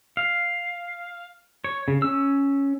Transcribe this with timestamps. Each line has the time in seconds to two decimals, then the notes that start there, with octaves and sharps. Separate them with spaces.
0.17 F5
1.64 C#5
1.88 C#3
2.02 C#4 E6